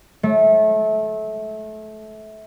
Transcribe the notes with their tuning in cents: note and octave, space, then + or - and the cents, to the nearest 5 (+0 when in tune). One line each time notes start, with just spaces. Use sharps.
A3 -25